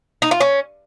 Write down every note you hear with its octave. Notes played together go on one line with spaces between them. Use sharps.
D#4
F4
C#4